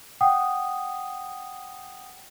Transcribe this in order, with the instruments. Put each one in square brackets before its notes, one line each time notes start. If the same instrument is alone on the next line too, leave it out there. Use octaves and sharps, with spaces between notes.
[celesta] F#5 G5 D#6